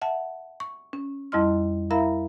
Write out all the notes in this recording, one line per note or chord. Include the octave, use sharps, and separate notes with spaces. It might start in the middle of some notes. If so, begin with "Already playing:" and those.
E5 F#5 A5
C#6
C#4
F2 G3 E4 D#5 C6 F6
E4 A#4 E5 F5 A#5 B5